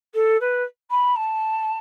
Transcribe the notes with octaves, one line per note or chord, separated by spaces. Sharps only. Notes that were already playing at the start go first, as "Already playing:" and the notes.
A4
B4
B5
A5